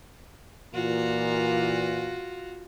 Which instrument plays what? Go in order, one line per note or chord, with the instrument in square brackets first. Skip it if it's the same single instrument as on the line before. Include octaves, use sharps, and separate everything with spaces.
[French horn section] A#2 E3 [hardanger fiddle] F4 F#4